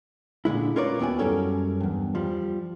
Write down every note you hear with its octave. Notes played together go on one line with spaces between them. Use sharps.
A#2 D3 G#3 E4
C#4 F4 A#4 B4 C#5 D5
D#2 B3 E4 F#4 G#5
F#2 E3 G3 C#4 A4 A#4
E2 G2
F3 G3